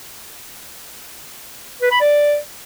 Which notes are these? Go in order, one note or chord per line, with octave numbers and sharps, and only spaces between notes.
B4
B5
D5